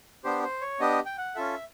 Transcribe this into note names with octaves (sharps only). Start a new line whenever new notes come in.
B3 D4 G4 C5
C5
C#5
B3 D4 G4 D#5
G5
F#5
C#4 F4 A4 E5